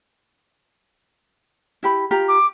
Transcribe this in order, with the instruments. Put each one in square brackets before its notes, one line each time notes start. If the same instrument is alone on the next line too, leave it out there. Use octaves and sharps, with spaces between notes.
[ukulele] E4 G4 B5
F4 G4 A#5
[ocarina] D6